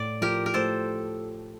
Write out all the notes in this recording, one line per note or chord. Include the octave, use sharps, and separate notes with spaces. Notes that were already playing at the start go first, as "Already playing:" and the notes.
Already playing: A2 D5
F3 G4 A#4
A#4
A3 A4 C5